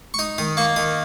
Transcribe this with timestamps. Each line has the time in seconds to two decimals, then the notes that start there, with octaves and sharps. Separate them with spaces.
0.14 C#6
0.19 D#4 D#6
0.38 D#3 D#6
0.57 A#3 C#6
0.76 D#3 D#6